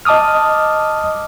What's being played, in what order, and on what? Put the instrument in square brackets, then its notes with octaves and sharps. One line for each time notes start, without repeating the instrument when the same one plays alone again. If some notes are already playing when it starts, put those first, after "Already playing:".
[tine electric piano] D#5 A5 D6 D#6 F6